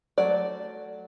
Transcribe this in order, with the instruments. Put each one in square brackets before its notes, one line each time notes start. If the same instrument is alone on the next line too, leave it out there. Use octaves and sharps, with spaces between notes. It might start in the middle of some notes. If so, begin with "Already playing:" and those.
[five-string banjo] F#3 A3 D5